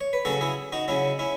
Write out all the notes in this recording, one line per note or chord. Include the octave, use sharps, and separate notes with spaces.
C#5
B4
C#3 F#3 C#4 F#4 A4
E4 G#4
D#4 F#4
C#3 F#3 C#4 E4
C#4 E4